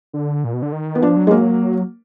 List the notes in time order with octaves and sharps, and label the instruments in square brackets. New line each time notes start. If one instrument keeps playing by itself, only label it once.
[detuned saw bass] D3
A#2
B2
D3
D#3
[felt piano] B3
[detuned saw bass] F3 [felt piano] D4
[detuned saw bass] F#3
[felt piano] G#3
A#3